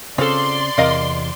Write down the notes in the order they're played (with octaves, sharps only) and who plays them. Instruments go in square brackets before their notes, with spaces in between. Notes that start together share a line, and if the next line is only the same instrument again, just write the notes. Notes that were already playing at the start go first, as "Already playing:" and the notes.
[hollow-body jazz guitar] C#3 C4 [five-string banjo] F4 A4 [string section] D5 C6
[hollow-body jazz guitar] E2 C3 [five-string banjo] A#4 D#5 F5